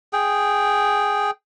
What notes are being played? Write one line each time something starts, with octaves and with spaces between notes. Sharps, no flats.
G#4 G5